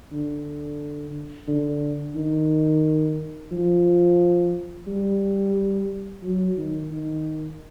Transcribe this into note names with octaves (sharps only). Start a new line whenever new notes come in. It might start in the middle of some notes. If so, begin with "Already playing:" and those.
D3
D3
D#3
F3
G3
F#3
D#3
D#3